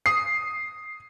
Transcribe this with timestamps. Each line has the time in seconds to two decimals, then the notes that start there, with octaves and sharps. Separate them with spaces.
0.06 D#6 C7